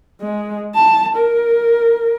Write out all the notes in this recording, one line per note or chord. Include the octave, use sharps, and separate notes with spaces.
G#3
A5
A#4